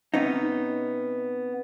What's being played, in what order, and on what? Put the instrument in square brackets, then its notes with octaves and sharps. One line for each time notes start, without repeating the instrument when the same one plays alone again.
[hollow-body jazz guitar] C3 B3 C#4 D#4